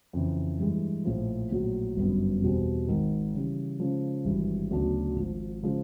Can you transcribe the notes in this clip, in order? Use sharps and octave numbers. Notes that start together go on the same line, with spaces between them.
F2 C#3 E3
G2 E3 G#3
A#1 A2 F3
A#1 A2 F#3
G1 F#2 D3 F#3 B3
E2 B2 G3 C4
G#1 G#2 D#3
C#3 E3 G3
C#3 F3 G#3
G#1 G2 E3
D2 C#3 F#3 B3 D4
G#1 G#2 F3
C#3 F3 G#3